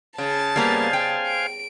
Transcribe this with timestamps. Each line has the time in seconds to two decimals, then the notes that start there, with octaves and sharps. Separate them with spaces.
0.18 C#3 A5 A6
0.56 G3 A#3 B3 C5 F5 G#5
0.93 G5
1.27 D7